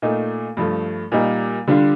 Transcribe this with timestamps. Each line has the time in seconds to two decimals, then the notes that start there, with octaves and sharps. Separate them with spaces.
0.02 A#2 A3 D#4
0.57 G2 F3 A3
1.12 A#2 G3 A#3 D#4
1.67 D3 G3 D4 F4